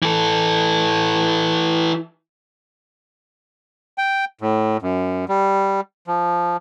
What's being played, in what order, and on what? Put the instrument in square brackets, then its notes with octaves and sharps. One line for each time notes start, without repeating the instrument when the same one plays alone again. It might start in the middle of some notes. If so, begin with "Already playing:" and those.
[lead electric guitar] E3 A4
[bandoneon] G5
A2
F#2
G3
F3